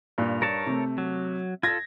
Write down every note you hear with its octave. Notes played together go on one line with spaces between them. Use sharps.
G2 A#2
G2 A#4 C#5 A5
C3 A3
F#3
F4 A4 G#6 A#6